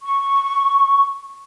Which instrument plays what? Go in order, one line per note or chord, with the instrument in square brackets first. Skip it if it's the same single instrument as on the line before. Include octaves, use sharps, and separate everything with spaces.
[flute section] C#6